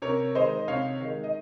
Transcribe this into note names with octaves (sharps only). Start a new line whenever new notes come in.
C3 A#4 C#5
D#3 G#3 C5 D#5
C3 C#5 F5
D#3 G#3
D#5